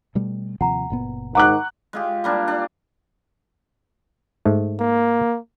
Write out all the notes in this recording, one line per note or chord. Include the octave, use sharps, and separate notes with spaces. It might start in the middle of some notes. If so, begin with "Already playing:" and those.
B2 G3 A3
D#2 C3 F3 F#5 A#5
F#1 A#2 B3
G#2 D#3 F#5 A#5 C#6 D6 F#6
G#3 F4 G4
G3 A#3 D4
D4
G#2 A3
A#3